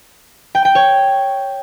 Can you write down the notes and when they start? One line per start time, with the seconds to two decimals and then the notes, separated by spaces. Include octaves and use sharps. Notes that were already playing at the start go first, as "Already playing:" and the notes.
0.55 G5
0.65 G5
0.75 C#5